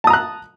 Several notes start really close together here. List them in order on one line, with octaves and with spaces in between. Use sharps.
A5 D#6 A#5 F#6